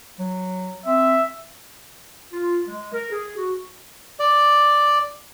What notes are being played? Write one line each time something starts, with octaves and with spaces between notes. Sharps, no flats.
F#3
C4 E5
F4
G#3
A#4
G#4
F#4
D5